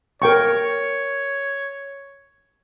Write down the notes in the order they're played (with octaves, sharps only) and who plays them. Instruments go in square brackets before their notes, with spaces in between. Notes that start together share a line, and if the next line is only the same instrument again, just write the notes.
[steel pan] A#4 G5 C#6 [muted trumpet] C#5